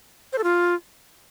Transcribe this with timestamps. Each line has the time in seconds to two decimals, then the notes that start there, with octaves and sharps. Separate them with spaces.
0.33 C5
0.38 A4
0.44 F4